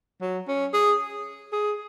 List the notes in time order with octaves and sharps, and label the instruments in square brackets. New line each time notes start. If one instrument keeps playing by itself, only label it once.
[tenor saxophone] F#3
C#4
G#4
G#4